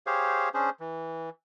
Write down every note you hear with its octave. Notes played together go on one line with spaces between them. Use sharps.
G4 G#4 C5 C#5 F5
C#4 D4 G#4 C5
E3